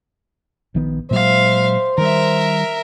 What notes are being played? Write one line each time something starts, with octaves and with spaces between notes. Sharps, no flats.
A#1 D#3 B3
A#2 F#3 G#3 C5 E5 F5
D#3 G3 A#4 E5